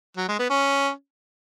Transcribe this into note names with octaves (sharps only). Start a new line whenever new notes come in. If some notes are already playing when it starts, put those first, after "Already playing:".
F#3
G#3
B3
C#4